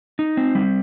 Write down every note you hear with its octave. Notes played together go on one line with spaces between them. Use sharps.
D#4
C4
G3